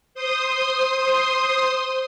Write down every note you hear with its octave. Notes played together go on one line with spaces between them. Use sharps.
C5 C6 D#6